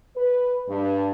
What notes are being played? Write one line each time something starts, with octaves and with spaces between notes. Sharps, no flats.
B4
G2